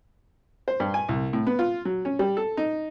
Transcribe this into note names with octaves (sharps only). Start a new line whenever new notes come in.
C5
G2
G#5
C2
A2
B3
F4
F#3
C#4
G3
A4
D#4